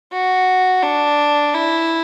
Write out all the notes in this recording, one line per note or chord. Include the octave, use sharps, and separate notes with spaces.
F#4
D4
E4